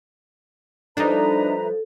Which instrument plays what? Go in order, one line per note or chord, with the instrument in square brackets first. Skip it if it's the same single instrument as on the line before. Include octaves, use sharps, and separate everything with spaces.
[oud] F3 G3 [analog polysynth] D4 D#4 [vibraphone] A4 [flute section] B4 E5 A#5